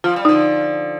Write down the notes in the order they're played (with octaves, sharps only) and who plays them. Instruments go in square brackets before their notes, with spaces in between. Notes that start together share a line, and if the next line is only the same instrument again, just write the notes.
[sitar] F3 [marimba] F4
[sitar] G3
[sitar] D3 F3 [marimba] D#4